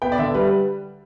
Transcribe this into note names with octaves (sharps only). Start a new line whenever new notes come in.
B3 G5
D5
D3 E5
G3 B4